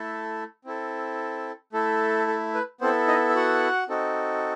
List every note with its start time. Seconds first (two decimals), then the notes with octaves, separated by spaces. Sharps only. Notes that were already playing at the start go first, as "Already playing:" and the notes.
Already playing: A3 E4 A4
0.65 C4 E4 A4
1.73 A3 E4 A4
2.27 A4
2.54 B4
2.81 B3 C4 E4 A4 C5
3.08 D#4 D#5
3.30 E5
3.35 F#4 F#5
3.89 C4 D#4 F#4 A4